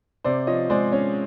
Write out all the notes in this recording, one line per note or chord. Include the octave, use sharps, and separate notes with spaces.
C3 C5 D5
F3 C#5 D#5
G#3 C5 D5
C#4 C#5